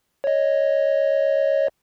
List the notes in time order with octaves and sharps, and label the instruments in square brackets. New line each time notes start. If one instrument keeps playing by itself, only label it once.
[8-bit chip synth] C#5 D#5